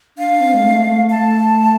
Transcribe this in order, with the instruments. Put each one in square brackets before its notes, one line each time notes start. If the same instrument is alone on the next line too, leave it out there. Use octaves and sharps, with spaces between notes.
[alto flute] D4 [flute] F5
[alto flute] C4
G#3
A3
A3
[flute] A5